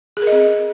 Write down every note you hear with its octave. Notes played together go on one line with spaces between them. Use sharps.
G#4
A#4
D#5
C4